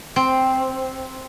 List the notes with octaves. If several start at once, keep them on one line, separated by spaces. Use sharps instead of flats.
C4